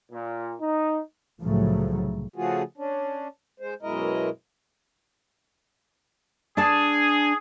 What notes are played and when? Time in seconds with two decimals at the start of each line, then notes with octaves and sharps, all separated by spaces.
0.11 A#2
0.59 D#4
1.42 C2 A2 C#3 F3 F#3 A3
2.35 C#3 F3 A3 F4 F#4 G#4
2.78 C#4 D4
3.60 G#3 C5
3.82 F#2 B2 G#3 E4 A#4 D#5
6.57 D4 G#4 D5 A5